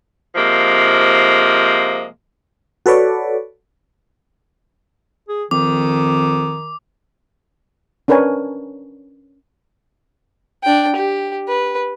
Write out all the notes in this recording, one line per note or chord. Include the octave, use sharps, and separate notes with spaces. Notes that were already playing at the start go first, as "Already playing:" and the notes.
C3 F3 G#3 A#3
F#4 A4 B4 C#5 D5
G#4
F2 D#3 D6
C#4 D4 A#4 B4 C#5 G#5
D4 G5
G4
B4